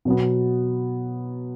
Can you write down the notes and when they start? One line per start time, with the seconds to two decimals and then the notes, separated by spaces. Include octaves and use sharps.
0.05 B2 F#3 B3